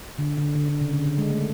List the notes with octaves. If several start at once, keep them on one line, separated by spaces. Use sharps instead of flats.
D3
D3
D3
D3
C#3
D3
D3
G#3
A3